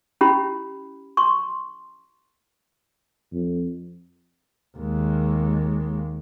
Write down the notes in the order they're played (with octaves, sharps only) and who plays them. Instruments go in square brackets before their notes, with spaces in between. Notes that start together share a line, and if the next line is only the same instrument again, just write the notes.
[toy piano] C#4 E4 G4 B5
C6 C#6
[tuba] F2
[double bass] D#2 G#3